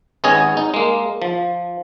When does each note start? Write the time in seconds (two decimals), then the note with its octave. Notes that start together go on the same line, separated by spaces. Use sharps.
0.24 G#1 B3 C#4 G#4 D#5 G#5
0.57 D#4
0.74 G#3 A#3
1.22 F3